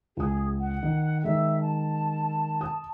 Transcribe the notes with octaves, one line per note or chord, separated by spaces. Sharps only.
C#2 G#4 D#6
F#5
D#3
D#3 G#3 E5
A5
D#6